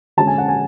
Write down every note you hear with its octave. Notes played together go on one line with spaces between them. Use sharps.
D3 G#3 C#4 A5
G#5
F#5
G#5